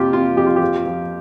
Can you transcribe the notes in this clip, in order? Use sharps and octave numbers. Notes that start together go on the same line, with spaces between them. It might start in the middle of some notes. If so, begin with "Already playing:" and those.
Already playing: F2 C3 F3 F4 G4
C3 F4
F2 G4
F4
G4
F3
F3